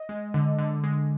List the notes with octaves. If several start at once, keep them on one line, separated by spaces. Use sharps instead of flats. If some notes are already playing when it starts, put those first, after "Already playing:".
Already playing: D#5
G#3
D3
D3
G#3